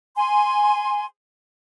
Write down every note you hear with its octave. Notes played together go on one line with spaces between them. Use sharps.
G#5 C6